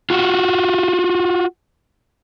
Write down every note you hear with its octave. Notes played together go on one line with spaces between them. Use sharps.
F4 F#4